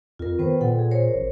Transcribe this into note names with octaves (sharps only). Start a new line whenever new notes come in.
F2 F4 A#4
D#3 B3 B4 C5
A#2 A4 F#5 G5
G#4
A#4 C5 C#5
A1